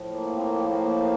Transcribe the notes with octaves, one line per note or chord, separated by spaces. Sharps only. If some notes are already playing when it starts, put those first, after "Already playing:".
Already playing: A2 F3
A#3
C4
A#3
A#3